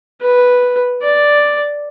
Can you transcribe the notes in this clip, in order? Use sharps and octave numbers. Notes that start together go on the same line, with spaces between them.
B4
D5